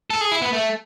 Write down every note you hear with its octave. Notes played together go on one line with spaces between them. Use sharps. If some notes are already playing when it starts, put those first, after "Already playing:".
A4
G#4
E4
B3
A3